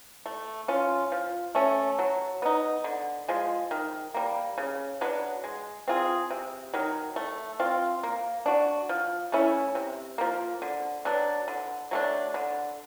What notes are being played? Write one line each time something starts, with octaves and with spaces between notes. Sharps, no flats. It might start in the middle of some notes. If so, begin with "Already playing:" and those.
A3
C#4 F4
F3
A3 C#4
F#3
B3 D#4
D3
F3 G#3
D#3
G3 A#3
C#3
F#3 B3 D4
G#3
C4 F4 G#4
C3
D#3 F#3
A3
C4 F4
A#3
D4 F#4
F3
A3 C#4 E4
C3
F3 A#3
D3
F#3 B3 D4
D3
F#3 A3 D4
D3